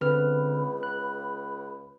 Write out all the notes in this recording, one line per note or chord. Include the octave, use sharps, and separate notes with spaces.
C#2 D3 C4 B4 B5 F6
F#6